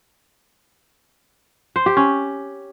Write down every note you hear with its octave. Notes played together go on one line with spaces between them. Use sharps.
C5
G4
C#4